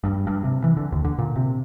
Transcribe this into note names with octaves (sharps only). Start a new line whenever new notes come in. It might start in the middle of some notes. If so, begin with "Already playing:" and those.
G2
G2
C3
E3
D3
D#2
D3
A#2
C3